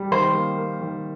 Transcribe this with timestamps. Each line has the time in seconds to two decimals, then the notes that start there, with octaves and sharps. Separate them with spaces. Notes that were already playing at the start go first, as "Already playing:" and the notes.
Already playing: G3
0.11 D#3 C5
0.34 A#3
0.57 A#3
0.81 D#3